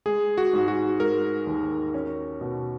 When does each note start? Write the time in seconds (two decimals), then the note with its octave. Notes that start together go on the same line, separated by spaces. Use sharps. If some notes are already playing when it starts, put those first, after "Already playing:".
0.06 G#3 G#4
0.38 F#4
0.53 G#2
0.68 F#4
1.00 G#3 A#4
1.47 D#2
1.94 C#4
2.41 B2